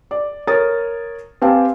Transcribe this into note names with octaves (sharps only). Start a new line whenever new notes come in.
D5
A#4 C#5 D#6 A6
C4 G4 B4 F5 G#5 A5